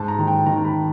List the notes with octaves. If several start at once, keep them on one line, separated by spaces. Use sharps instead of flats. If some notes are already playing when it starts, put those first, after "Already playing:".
Already playing: G#2 A5
A#5
D#3
G5
D#3 A#5
B5